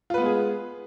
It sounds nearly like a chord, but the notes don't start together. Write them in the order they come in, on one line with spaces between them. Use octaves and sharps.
F4 B4 B3 G#3 G#4